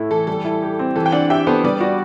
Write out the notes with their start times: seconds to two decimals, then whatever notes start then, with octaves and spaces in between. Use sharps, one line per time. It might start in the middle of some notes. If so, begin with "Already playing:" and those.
Already playing: A2 A3 E4
0.10 E3 A4
0.27 G3 A4
0.45 E4
0.62 G4
0.79 C4
0.96 E3 A4
1.06 G5
1.12 D4 D5 F#5
1.30 G4 E5 G5
1.46 B3 A4 C5
1.64 G3 B4 D5
1.81 F#4